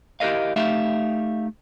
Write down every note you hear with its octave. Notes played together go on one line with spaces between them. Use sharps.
E4 G4 A4 A#4 D#5 F5
A3 D#4 G4 E5 F5